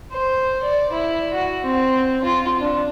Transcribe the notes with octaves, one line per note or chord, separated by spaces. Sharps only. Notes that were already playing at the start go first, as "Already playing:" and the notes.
C5
D5
E4
F#4
C4
F4
D4